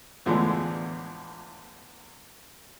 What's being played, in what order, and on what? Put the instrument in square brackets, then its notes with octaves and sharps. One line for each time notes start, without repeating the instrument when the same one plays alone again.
[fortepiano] E2 A2 D3 E3 F3 G#3